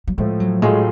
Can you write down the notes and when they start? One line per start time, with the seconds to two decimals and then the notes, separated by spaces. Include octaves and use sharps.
0.08 F#3
0.18 A2 F3 G#3 A3
0.40 F#3
0.62 A2 F#3 G#3 A3 F4 G#4